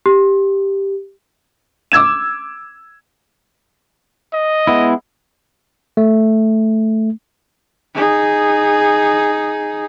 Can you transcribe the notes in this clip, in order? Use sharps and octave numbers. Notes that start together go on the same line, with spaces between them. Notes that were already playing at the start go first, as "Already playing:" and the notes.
G4
D6 E6 G#6 E7
D#5
G#3 B3 E4
A3
D#4 G#4